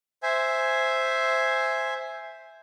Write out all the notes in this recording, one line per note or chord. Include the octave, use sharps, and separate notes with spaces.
C5 E5 G#5